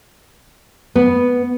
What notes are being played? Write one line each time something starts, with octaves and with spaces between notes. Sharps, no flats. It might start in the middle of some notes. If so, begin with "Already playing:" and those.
B3